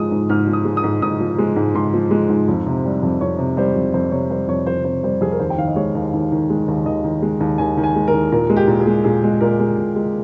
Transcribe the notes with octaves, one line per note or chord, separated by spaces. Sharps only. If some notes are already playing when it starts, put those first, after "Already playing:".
Already playing: G#2 F3 G#3 D#6
G#2
G#2 F6
F3
D#6
G#3
D#6
G#2
G#2 D#6
F3
G#3
G#2
G#2 C6
F3
G#3
G#2
F2
C3
G3
F2
F2 C#5
C3
G3 C5
F2
F2 C5
C3 C#5
G3 C5
F2 C#5
F2 C5
C3 C5
G3 C5
F2 G#4
A#4
D#2 C5
G5
D#3 F5
D#5
G#3 C#5
D#2
D#2
D#3
G#3
D#2
D#2 D#5
D#3
G#3
D#2
D#2 G#5
D#3
G#5
G#3
A#4
D#2
A#2 A#4
G#3
G4
A#2
G#4
G#3
A#2 G#4
G#3
A#2 A#4
G#3
A#2
G#3